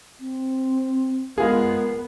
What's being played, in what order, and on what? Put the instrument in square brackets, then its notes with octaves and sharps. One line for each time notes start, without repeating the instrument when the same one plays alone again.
[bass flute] C4
[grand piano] G#3 F4 G#4 [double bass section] B3 [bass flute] A#4